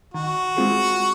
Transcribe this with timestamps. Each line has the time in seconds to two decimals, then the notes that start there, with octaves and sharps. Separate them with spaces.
0.14 D#3 F#4
0.57 G#3 C4 F4 G#4